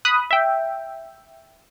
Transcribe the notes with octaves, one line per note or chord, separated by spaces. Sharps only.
B5 D#6 F#6
E5 G5